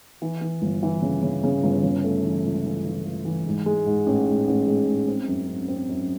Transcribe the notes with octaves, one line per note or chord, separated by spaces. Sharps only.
E3
E3
G1
E3
C#3
C#3
C#3
G1
C#3
A3
E3
C#2
E3
E3
A3
E3
G#2
G#3
G#2
A1
G#2
A1
G#3
G#2
C4
F#2
C4
C4
F#2